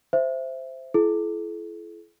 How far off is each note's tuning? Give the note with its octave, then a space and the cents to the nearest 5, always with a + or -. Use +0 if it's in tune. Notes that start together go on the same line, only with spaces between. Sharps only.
C5 -5 E5 +15
E4 +35 A4 -45